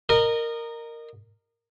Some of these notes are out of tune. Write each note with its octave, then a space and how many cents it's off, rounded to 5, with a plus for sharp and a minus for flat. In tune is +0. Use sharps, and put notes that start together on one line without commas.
A#4 -10 D#5 -25